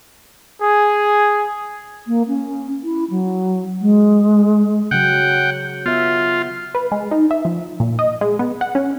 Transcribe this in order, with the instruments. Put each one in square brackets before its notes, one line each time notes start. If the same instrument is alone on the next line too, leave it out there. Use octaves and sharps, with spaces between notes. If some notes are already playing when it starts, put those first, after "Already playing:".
[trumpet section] G#4
[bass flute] A#3
C#4
E4
F#3
G#3
[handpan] C#3 F#3 [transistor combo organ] F#5 G5
[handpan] B3 E5 [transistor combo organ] F4
[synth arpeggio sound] B4
G#3
D#4
E5
F3
A#2
D#5
G#3
B3
F#5
C#4